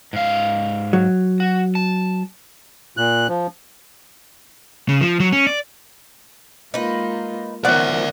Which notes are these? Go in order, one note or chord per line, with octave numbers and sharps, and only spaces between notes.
G#2 F5
F#3
F#4
A5
A#2 F#6
F3
C#3
F3
F#3
C#4
D5
G#3 A#3 D#4 F4 B4
D#3 F3 F#3 B3 D5 E5 F#5